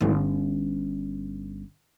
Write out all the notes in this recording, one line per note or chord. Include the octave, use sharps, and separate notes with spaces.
G1 C#4